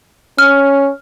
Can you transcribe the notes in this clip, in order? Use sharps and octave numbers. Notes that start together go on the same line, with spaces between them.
C#4 F6